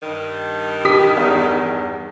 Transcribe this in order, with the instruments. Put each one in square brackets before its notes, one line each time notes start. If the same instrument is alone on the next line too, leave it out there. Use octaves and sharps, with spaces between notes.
[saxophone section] G2 D#3
[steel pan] G4 [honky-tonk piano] D#6 B6
[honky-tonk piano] E2